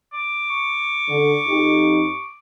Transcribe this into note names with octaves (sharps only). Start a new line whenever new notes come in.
D6
C#6
D3
F2 D#4 G4